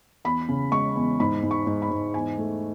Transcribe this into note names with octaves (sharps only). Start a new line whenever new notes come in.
E2 B5
C#3
G#3 C#6
E2
G#2 B5
G#2
C#6
G#2
B5
G#2
E2 G#5
A3